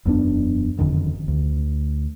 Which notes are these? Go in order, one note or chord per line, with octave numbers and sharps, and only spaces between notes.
E1 F#2 B3 D4
F#1 F2 D3 D#3
D2